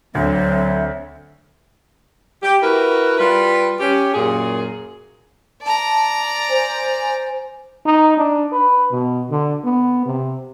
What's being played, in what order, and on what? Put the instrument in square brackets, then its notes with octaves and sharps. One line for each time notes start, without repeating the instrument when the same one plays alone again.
[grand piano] D2 [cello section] D3 C4 [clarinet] F#3 [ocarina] E5
[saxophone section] G4
E4 F#4 A#4 B4
G3 F4 B4
C#4 G4
F#2 A#2 G#4
[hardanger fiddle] D5 A#5 [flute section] A5
[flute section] C5 G#5
[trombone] D#4
D4
B4
B2
D3
B3
C3